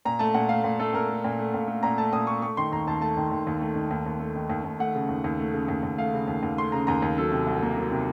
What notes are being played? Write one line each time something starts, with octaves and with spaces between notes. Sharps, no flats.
A#2 A#5
A3 A5
A#2 F#5
A3 F5
A#2
A3 A4
A#2 A#4
A3
A#2
A3
A#2
A3
A#2 A#5
A3 A5
A#2 D#6
A3 C#6
A3 C#6
D#3 C6
D#2 A#5
D#2 A5
A3 A5
D#3
D#2
D#2
A3
D#3
D#2
D#2
A3
D#3
D#2
D#2
A3 F#5
C#3
D#2
D#2
A3
C#3
D#2
D#2
A3 F5
C#3
D#2
D#2
A3 C6
C#3 A#5
D#2 A#5
D#2
F#3 A4
C3
C2
A#3
F#3
C3